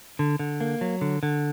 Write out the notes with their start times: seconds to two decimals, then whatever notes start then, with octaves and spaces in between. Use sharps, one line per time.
0.19 D3
0.39 D3
0.61 A#3
0.81 F#3
1.01 D3
1.23 D3